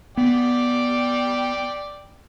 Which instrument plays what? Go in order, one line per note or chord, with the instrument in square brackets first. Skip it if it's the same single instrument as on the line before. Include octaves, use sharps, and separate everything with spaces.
[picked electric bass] B3 [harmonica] D5 G5